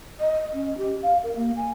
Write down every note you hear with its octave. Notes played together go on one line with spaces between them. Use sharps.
D#5
C#4
G4
F5
A#4
A#3
G#5